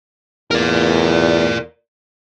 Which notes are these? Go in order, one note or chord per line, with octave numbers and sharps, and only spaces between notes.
E2 A#4 D5